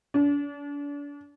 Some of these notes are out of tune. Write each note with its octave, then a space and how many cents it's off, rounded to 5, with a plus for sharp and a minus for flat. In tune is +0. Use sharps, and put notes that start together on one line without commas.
D4 -40